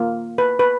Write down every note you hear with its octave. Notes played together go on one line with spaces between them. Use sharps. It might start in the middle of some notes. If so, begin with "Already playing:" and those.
Already playing: A#3 F4
B4
B4